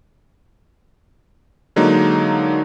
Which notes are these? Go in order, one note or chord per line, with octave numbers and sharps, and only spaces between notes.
D3 F#3 G#3 A#3 D#4